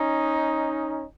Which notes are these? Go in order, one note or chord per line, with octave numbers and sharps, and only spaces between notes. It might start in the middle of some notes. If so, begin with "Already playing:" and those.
Already playing: C#4 D#4